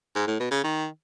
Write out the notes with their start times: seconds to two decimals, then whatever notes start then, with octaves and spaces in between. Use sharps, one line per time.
0.15 G#2
0.27 A2
0.40 B2
0.51 C#3
0.63 D#3